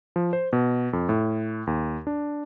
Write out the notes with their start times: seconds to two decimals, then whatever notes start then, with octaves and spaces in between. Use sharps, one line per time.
0.16 F3
0.33 C5
0.53 B2
0.93 F2
1.09 A2
1.67 D#2
2.07 D4